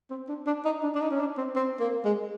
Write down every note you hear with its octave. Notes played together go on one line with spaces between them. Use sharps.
C4
D4
D4
D#4
D4
D4
D#4
C#4
D4
C4
C4
A#3
G#3